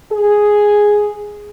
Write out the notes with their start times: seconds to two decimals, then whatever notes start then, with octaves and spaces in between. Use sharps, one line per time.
0.11 G#4